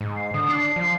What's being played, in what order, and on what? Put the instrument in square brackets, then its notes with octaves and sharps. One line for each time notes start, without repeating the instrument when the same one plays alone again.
[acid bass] G#2
[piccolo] C7
[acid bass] D3 [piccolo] D#6
[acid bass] D4 [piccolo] C7
[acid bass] F3